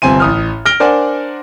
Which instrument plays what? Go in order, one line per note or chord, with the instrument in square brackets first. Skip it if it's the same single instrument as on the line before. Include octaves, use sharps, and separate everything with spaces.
[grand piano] G1 C3 C4 G#5 C6 D#7
A1 D#6 F6
F6 A#6 D7 G7
D4 A#4 C5 D5 F#5 G#5